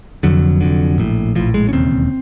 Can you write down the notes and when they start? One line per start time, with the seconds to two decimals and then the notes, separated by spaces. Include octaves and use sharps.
0.23 F1 F2 D3 F#3
0.61 F1 F2 D3
0.98 A#1 A2
1.35 A#1 A2 F3
1.54 G#3
1.69 C#4
1.73 E1 D#2 C#3 C4